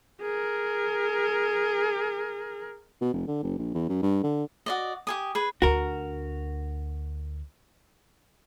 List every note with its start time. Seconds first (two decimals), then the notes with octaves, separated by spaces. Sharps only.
0.22 G#4 A#4
3.01 B2
3.13 F1
3.28 D3
3.43 F#1
3.58 A#1
3.74 E2
3.89 F#2
4.02 G2
4.24 D3
4.66 F#4 D5 D#5
5.07 G4 G#5 D#6
5.35 G#4 B4
5.62 D2 D4 F#4 A#4